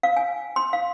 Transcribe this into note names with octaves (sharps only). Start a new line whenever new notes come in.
F5
G#5
C6
F5